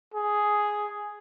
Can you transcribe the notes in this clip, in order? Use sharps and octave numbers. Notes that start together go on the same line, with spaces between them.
G#4